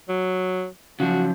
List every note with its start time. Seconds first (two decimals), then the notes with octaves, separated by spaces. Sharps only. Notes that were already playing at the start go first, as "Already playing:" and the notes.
0.09 F#3
1.00 C#3 F3 F#3 F#4